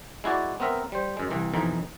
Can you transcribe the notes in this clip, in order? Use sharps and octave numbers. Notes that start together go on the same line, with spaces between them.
G#3 E4 F#4 D5
B3 C4 A#4 E5
G3 C5
F#2 G#3
C2 E3
B1 F2 E3 D#4